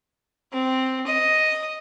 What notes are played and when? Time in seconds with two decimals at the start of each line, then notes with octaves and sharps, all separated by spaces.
0.52 C4
1.06 D#5